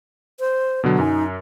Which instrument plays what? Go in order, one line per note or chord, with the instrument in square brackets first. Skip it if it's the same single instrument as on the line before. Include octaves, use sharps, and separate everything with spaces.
[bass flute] C5
[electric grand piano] B2 D3 F#3
[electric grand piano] F#2 G#5 [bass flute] D#4